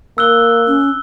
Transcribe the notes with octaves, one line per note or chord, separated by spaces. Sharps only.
A#3 E6 F#6 G7
C#4